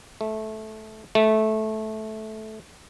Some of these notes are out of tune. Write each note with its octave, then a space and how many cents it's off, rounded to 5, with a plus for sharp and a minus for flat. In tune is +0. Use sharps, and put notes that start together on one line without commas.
A3 -15
A3 -15